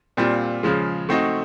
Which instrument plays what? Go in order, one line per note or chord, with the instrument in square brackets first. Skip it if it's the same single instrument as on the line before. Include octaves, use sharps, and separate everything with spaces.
[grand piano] A#2 G3 C4 F4
C#3 F3 G#3
A3 C4 D#4 F#4